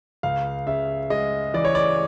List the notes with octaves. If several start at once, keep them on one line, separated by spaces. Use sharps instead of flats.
C#2 F5
C#3 E5
G#3 D#5
E3 D5
C#5
D5